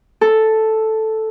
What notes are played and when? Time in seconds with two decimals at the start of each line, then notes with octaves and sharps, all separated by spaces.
0.21 A4